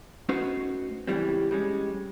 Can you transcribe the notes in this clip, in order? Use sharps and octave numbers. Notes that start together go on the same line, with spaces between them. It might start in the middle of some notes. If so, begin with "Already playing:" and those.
A3 C#4 D#4 F#4 B4 C5
C#2 A2 E3 G3 C4
G3 G#3 C#4